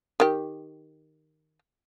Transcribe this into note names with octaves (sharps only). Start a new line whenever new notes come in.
D#3 G4